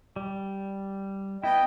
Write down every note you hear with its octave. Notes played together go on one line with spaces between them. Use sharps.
G3
B3 E4 D#5 G5